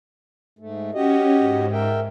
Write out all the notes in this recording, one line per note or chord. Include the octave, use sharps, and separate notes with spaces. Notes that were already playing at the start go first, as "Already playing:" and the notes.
G#2 A3
C#4 F#4 G4 D#5
G#2
A#4 E5 G5